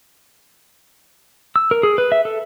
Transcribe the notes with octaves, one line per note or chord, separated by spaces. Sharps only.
E6
A#4
G#4
B4
E5
A4